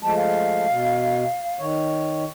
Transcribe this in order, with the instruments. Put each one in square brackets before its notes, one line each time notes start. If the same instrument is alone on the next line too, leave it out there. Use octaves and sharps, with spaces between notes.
[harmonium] F3 G#3 A3 [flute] A5
[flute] F5
[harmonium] B2
D#3 C#5